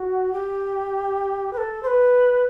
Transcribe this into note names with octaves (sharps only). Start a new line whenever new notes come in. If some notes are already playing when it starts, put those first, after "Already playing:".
Already playing: F#4
G4
B4
A4
C5
B4